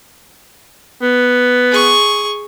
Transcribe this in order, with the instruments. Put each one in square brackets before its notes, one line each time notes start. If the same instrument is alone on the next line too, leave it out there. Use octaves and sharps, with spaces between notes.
[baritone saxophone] B3
[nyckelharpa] G#4 C#6